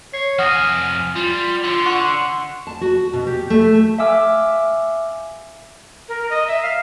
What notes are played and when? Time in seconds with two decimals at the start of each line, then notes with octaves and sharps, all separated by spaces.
0.14 C#5 C7
0.39 F2 F#5 G#5 D#6 F6 A#6
1.16 G3 F4
1.64 D3 F4 C6
1.86 F#5 C6 C#6
2.67 A5
2.81 F#4
3.13 B2
3.27 G4
3.50 A3
3.99 E5 F5 G#5 D6 E6 F6
6.08 A#4
6.30 D#5
6.48 E5
6.62 F5